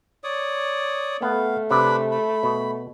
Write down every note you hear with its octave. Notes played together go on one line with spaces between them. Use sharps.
C#5 D5 D#6
A3 B3 F5
C3 D4 B4 B5
B5
B2